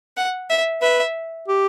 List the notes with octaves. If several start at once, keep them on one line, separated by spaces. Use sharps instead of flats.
F#5
E5
B4 E5
G4